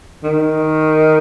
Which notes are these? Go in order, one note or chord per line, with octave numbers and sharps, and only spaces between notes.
D#3